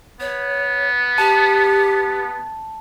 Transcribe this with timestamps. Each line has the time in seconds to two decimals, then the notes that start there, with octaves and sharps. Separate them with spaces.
0.20 B3 C#5
1.18 G4 A5